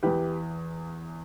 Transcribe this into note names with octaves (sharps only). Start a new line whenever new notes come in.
E2 E3 G4 B4